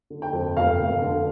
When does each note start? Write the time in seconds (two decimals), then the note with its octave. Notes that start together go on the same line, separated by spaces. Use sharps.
0.10 D3
0.22 G5
0.33 F2
0.56 F1 F5
0.79 F1
1.02 D3